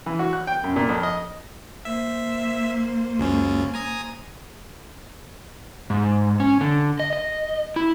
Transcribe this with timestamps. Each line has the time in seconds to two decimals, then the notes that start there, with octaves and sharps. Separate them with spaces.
0.06 E3
0.19 F#4
0.33 F#6
0.47 G5
0.64 F#2
0.76 A#2
0.89 F2
1.03 D#5
1.85 A#3 C5 E5
3.19 C#2 F#2 C#4
3.74 G#5 A#5 D#6
5.90 G#2
6.40 C#4
6.61 D3
7.00 D#5
7.13 D#5
7.76 E4